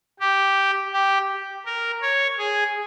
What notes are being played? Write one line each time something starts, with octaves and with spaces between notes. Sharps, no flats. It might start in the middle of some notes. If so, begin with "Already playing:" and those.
G4
G4
A#4
C#5
G#4